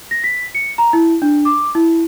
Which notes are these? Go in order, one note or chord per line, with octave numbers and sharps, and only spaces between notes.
A#6
B6
C#7
A#5
E4
D4
D6
E4